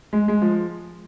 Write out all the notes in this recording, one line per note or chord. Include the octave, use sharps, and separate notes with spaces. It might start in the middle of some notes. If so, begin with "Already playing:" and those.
G#3
G#3
F3